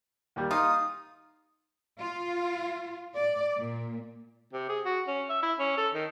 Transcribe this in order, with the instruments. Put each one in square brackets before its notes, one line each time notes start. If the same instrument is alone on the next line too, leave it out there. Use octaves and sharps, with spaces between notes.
[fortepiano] D#2 G3
[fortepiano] D#4 [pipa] F4 [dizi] D#6
[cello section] F4
D5
A#2
[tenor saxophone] C3
G#4
F#4
C#4
E5
E4
C#4
A4
D#3